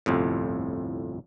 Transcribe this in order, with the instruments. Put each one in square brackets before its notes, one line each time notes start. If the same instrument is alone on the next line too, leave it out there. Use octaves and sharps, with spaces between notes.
[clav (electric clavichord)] G1 C2 F2 A2